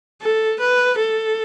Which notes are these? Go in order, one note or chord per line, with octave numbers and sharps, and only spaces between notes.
A4
B4
A4